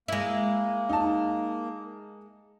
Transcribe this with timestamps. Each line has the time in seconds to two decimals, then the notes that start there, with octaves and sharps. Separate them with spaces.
0.08 G#3 A#3 E4
0.89 D#4 A5